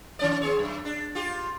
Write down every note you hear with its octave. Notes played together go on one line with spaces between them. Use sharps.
D#3 C#4 D5
B3 G#4 C#5
F#2
D4
F4 G4